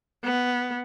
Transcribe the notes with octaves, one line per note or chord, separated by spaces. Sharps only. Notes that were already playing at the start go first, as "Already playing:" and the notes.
B3